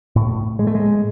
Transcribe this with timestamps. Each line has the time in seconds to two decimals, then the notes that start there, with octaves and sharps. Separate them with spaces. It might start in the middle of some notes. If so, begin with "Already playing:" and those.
0.16 A2
0.59 G#3
0.67 A3
0.75 G#3